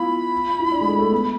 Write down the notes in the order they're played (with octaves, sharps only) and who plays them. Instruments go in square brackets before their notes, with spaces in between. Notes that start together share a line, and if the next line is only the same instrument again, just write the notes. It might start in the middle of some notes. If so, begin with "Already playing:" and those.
Already playing: [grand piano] B3 E4 F4 [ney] B5
[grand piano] F4
E4
D4
G#3
A3
A3
B3